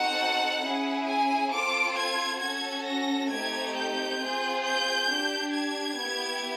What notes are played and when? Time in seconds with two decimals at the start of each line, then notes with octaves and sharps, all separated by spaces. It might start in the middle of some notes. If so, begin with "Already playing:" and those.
Already playing: C4 D#4 F#4 A4 F#5
0.61 C#4 E4 G#4
1.06 G#5
1.51 C4 F4 A4 D6
1.95 G#6
2.40 C#4 F#4 A4 G#6
2.85 A#6
3.30 A3 C4 D#4 G4 G#6
3.75 G6
4.19 C4 F4 G#4
4.64 G6
5.09 D4 G4
5.53 G#6
5.98 B3 E4 G4